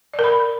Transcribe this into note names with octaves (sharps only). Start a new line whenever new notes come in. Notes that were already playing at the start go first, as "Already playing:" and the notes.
D5
A#4
B5